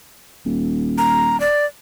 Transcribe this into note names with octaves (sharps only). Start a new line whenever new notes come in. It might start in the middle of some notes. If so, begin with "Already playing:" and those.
D#1
A#5
D5